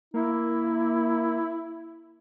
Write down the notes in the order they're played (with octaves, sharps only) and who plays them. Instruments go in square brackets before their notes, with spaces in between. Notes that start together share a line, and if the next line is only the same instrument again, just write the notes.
[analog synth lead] A#3 [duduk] E4